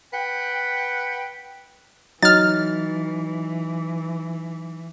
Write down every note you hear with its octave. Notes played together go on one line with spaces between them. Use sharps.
B4 F#5 G5
E3 F#3 D#4 F6 A6